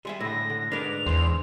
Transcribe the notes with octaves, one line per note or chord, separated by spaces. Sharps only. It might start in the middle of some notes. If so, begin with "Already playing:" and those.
G3 G#3 G#4 E5
A2 D3 E4 A#6
D3
G#2 G#3 D4 A#4 B4 D5 F7
E2 C5